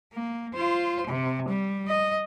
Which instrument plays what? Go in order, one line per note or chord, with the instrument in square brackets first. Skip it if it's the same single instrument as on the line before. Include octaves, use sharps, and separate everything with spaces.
[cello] A#3
F4 C5
C3
G3
D#5